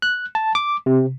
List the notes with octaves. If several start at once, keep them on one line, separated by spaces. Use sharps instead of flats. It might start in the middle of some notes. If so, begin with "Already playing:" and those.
F#6
A5
D6
C3